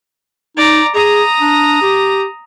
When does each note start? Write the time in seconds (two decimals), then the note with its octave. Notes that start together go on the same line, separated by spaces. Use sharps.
0.57 D#4 D5 A#5
0.95 G#4 A#5 D#6
1.41 D4
1.81 G4